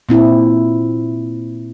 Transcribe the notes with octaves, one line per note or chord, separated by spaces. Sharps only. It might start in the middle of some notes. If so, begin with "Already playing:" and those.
A#2 C4 E4